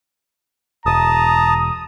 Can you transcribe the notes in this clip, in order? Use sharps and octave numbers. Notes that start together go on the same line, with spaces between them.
E1 A5 A#5 D#6